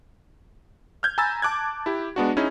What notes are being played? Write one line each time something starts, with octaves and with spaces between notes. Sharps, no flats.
F6 G6 G#6
G#5 A#5 B5 E6 A6
A5 D6 F#6 G#6
E4 G4
G#3 B3 D4 F#4
C#4 D#4 E4 G#4